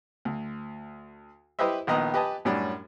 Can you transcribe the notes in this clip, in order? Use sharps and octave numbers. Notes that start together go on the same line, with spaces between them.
D2
E4 G4 B4 C5 D#5 E5
A#1 D#3 B3 D#5 A#5
G4 B4 D#5 G#5 A5
F#2 A2 G3 C#4 D4